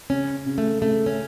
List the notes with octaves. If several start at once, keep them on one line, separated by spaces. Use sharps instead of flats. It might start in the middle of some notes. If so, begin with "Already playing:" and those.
C#3 C#4
C#3
A3
C#3 A3
C#4